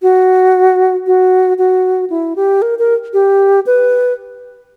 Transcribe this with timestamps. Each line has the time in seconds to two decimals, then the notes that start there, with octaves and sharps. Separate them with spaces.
0.02 F#4
1.07 F#4
1.58 F#4
2.10 E4
2.36 G4
2.62 A#4
2.79 A#4
3.13 G4
3.66 B4